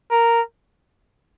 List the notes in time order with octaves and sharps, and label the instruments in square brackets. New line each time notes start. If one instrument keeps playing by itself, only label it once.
[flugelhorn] A#4